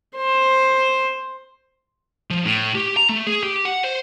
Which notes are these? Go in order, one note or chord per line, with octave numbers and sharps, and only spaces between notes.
C5
F3
A2
G4
A#5
A3
G#4
G4
F#5
C5